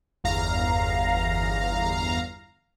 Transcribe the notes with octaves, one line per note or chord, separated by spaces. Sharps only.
G1 E2 F5 A#5